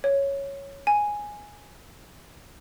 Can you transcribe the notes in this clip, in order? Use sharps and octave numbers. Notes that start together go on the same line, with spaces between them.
C#5
G#5